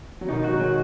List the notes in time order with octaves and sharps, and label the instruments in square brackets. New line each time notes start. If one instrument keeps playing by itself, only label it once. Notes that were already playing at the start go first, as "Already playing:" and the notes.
[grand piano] F#3
[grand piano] B2 D#3 [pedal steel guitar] D#4
[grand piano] F#3 [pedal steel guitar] F#4
[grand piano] D#3 G#3
[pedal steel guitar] F#3